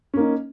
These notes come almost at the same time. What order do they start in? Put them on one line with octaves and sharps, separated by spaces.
C#4 A#3 D#4